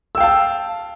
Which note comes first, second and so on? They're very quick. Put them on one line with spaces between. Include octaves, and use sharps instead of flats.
E6 G5 F5 A5